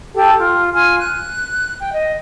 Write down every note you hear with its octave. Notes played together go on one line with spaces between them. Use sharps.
G4 A4 G5 A5
F4
F4 G#5
F#6
G5
D#5